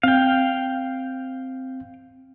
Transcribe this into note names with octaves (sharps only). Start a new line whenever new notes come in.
C4 F5 G5